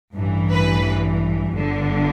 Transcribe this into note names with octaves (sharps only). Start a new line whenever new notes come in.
A1 G2 E3
B4
G1 G2 D3